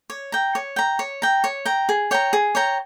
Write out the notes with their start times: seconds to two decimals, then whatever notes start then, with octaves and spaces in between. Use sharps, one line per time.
0.10 C#5
0.32 G5 A#5
0.55 C#5
0.76 G5 A#5
0.99 C#5
1.22 G5 A#5
1.44 C#5
1.66 G5 A#5
1.89 G#4
2.11 C#5 G5 A#5
2.33 G#4
2.55 C#5 G5 A#5